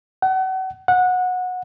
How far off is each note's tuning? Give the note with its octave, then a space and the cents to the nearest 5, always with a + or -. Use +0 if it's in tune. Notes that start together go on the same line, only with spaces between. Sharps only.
F#5 +35
F#5 -20